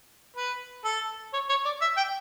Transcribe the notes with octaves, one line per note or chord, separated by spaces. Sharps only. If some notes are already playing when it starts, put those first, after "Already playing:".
B4
A4
C#5
C#5
D5
E5
G5